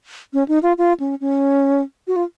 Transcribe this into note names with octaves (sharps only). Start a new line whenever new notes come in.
C#4
D#4
F4
F4
C#4
C#4
F#4
F4